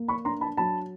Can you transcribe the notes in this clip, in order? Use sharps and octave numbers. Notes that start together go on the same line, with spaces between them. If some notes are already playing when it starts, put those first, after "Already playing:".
Already playing: A#3
B5 C#6
D4 A#5 C6
A5 B5
F#3 A5 B5